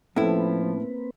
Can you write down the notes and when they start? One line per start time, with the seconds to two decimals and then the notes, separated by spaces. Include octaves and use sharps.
0.16 A2 F3 A#3 C4 C#4 E4 A4 B4